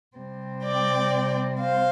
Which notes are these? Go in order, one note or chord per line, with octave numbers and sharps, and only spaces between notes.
C3 G3 C4
D5 G5
C5 F5